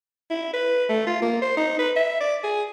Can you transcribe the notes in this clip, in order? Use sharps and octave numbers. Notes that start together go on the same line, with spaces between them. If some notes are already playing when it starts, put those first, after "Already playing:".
E4
B4
A3
F4
A#3
C5
D#4
B4
E5
D5
G#4